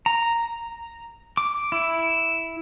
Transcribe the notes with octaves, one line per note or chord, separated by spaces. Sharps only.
A#5
D6
E4